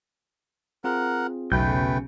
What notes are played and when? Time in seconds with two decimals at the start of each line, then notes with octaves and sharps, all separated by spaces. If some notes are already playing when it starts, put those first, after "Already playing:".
0.84 C4 F4 G#4 A#4 F#5
1.52 B1 E2 C#3 A3 B4 G5 G6